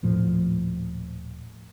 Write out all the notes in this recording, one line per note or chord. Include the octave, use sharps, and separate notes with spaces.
D#1 A2 F3